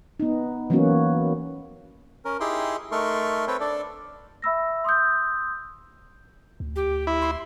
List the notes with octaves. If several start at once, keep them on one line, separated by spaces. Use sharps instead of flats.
B3 D#4
E3 F#3 A#3 B3 C#4 F#4
C#4 A#4
D#4 E4 G4 G#4 G5 C6
A3 D#4 A4 A#4 C6 C#6
C4 A4 B4 C#5 G5
D4 A4 D5
E5 B5 E6 A#6
C6 D#6 E6 G6
D2
G4
E4
C6